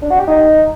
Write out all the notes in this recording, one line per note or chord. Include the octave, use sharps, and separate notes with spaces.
D4
F#4
G4
D#4